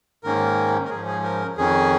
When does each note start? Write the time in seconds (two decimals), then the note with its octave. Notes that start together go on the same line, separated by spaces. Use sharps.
0.24 G#2 D#3 A#3 C#4 A#4
0.85 A#4
0.90 G#2 F3 C#4 G#4
1.07 G#4
1.24 A#4
1.56 F2 D#3 C#4 G#4